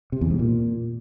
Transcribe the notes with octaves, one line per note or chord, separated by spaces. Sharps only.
C3
E2
G#2
A#2